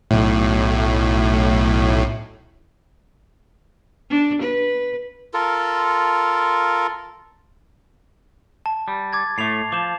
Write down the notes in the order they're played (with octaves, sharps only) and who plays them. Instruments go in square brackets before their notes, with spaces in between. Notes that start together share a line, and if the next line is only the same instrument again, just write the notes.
[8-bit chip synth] B1 A2
[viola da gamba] D4
B4
[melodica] F4 A4 A#4
[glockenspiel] A5
[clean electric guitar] G3
[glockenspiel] D6 G#6 A6
[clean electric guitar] A2 A3 [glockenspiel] C7 F7
[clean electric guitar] F3 [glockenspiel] D6 E7